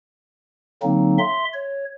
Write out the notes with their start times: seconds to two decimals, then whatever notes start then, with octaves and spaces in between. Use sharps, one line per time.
0.83 D3 F#3 A#3 C4 D#4
1.19 E5 C6
1.54 C#5